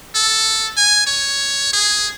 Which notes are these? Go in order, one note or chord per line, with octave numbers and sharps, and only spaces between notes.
A4
G#5
C#5
G#4